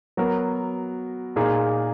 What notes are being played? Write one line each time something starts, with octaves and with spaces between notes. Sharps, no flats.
F#3 B3 F#4 A#4
A#2 A#3 D#4 G#4